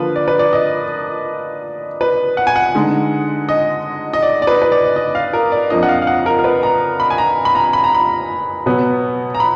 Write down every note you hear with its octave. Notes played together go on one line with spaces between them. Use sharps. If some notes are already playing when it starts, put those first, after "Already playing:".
Already playing: D3 F3 A#3 F4 B4
D5
B4
D5
D#5
B4
F#5
G#5
F#5
D3 G#3 D#4
D#5
D#5
D5
D5
B4
B4
D5
D#5
F5
A#4
D5
F2 F3 A#3 D4 D#5
F#5
F5
F5
F#5
A#4
A#4
B4
A#5
B5
G#5
A#5
B5
A#5
B5
A#5
B5
B2 F#3 B3
A#5
B5